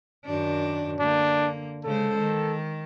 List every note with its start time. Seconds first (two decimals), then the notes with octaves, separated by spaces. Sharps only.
0.25 F#2 D#3 D4
1.00 D3 A#3 D4
1.84 C#3 G#3 A4 C5
2.18 D#3